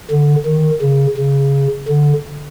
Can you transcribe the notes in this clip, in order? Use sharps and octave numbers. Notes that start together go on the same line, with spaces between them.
D3
D#3
C#3
C#3
D3